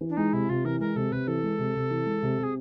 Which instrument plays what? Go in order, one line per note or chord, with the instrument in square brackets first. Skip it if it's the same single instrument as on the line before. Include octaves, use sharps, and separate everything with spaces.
[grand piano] E3
[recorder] D4
[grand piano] G#3 [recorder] D#4
[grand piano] C3 [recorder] E4
[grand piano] C3 [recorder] F4
[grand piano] E3 [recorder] A#4
[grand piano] G#3 [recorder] A#4
[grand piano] C3 [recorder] A4
[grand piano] C3 [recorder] B4
[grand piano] E3 [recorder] A4
[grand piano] G#3
C3
C3
E3
G#3
C3
[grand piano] C3 [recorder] G#4